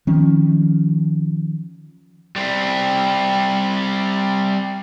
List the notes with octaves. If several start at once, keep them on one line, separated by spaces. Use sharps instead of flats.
D#3 F3 C#4
G3 C4